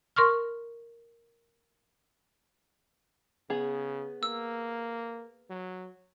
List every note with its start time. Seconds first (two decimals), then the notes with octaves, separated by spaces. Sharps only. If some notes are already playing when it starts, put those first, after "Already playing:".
0.16 A#4 C6 C#6 F6
3.50 C#3 B3 G#4
4.23 A#3 E6
5.50 F#3